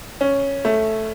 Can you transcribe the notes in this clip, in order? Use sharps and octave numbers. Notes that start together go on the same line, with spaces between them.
C#4
A3